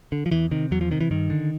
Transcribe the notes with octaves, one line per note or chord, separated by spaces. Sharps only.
D3
F3
E2 E3
C3 D#3
E2 F#3
F3
C3 D#3
E3
G2 D#3
D3